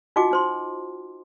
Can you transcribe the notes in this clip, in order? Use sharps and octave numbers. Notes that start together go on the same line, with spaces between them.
D#4 F4 F#4 D#5 G5 D6
D#4 C5 C6